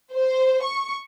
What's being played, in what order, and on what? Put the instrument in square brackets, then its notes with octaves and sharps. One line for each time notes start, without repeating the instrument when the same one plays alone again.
[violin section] C5
C#6